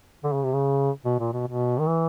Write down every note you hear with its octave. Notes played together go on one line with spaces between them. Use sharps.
D3
C#3
C3
C#3
B2
A#2
B2
B2
D#3
E3